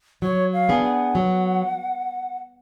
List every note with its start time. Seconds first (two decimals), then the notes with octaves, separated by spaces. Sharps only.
0.22 F#3 C#5
0.53 F5
0.69 B3 D4 G#4
0.84 F#5
1.15 F#3